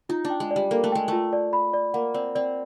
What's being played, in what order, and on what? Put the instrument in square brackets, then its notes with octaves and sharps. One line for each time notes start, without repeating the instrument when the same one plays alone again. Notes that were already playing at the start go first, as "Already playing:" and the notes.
[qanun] D#4 [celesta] F4
[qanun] D4
[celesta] G5
[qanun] G#3
[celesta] D5
[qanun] G3
[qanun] A#3 [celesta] A4
[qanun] A3
[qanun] G#3 [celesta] G5
[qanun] A3 [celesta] F4
[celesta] D5
B5
D5
[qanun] A#3 [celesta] F#5
[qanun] C4 [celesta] D5
[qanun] C4 [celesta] D5